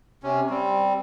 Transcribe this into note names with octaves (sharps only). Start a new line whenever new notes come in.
C3 C#4
G3 C4